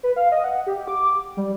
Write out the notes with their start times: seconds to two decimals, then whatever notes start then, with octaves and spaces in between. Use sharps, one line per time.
0.03 B4
0.16 F5
0.32 D#5
0.44 F#5
0.67 G4
0.88 D6
1.37 G3